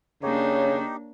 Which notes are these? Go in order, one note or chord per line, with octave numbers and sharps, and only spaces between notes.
C#3 A#3 D4 D#4 G4 C#5